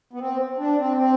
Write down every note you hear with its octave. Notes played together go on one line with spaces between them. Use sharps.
B3
C4
D4
C4
C4